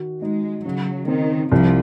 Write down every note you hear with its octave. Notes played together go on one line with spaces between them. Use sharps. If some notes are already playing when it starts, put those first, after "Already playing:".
Already playing: D#3 F#4
G#3 D#4
C#3 F#3
D#3 C4
C2 F3